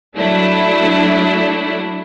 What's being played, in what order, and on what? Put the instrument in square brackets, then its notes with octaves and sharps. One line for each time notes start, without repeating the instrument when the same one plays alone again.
[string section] F#3 A3 D4 E4